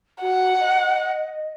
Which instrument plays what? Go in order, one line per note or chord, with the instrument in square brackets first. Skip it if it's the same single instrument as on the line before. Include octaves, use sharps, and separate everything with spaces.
[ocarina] F#4 [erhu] F#5
[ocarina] D#5